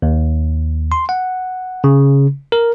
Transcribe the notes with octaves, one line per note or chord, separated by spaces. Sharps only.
D#2
C6
F#5
C#3
A#4